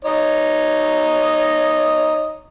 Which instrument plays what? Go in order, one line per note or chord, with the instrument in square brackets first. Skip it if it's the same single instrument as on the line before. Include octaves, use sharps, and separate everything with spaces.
[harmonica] D#4 C#5 D#5